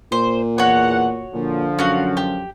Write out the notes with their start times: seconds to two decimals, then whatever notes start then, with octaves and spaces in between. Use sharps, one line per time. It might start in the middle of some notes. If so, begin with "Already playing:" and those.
0.12 A#2 C5
0.58 E2 F#4 C#5 F#5
1.34 A#2 D3 F3
1.79 F#2 C#4 F#4 F5
2.17 G4